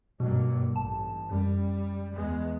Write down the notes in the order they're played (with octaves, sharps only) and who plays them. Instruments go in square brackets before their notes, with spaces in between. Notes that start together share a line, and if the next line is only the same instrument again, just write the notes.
[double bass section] G2 F#3 A#3 [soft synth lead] B2
[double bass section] A1 [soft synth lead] A5
[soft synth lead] F#2 [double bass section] G3
[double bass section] E2 G#3 B3